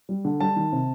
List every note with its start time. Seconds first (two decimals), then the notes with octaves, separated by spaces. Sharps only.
0.09 G3
0.25 D3
0.40 G3 A5
0.56 D#3
0.72 C3